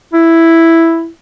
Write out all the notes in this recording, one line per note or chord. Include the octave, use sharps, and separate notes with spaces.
E4